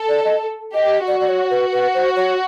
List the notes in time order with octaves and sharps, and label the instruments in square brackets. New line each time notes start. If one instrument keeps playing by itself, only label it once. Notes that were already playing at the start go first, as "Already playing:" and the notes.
Already playing: [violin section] A4
[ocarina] D5
D#5
[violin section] G4 [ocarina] D#5
[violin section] F#4 [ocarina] D5
[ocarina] D5
C#5
B4
B4
C5
C#5